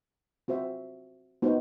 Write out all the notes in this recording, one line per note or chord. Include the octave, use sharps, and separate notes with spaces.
C4 F#4 C5 E5
B3 D#4 F#4 C5